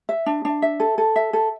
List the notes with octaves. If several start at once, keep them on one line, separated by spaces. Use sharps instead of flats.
E5
D4
D4
E5
A4
A4
E5
A4